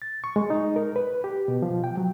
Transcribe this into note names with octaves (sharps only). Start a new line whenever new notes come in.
A6
C#6
G#3
D#4
A#4
B4
G4
B2
F3
G5
F#3